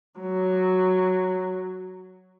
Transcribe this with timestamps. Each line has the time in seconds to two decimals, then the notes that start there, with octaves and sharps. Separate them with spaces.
0.20 F#3